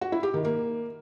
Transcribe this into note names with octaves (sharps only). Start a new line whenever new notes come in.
F#4
E4
G4
D#3
A#3